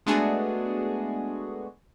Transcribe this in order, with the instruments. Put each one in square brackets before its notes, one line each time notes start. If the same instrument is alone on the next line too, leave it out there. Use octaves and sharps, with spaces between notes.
[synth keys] G#3 A3 B3 D4 F#4 G#4